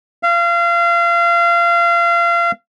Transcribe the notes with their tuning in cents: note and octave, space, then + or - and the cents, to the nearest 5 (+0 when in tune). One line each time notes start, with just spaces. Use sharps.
F5 -30